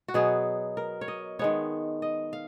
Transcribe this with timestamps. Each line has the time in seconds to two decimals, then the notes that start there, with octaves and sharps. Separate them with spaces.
0.08 F#4
0.14 B2 F#3 B3 G#4
0.77 A#4
1.01 C#5
1.08 D#5
1.39 D#3 G#3 B3 C#5
2.02 D#5
2.33 F5